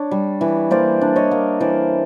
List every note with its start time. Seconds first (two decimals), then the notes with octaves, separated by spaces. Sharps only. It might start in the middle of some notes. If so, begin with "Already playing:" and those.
Already playing: D4 C#5
0.11 G3
0.41 E3
0.71 A#3 C5 D5
1.01 D4
1.16 C#5 D#5
1.31 A#3
1.60 E3 C5 D5